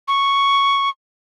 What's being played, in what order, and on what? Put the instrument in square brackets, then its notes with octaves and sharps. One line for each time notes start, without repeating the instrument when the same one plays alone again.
[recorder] C#6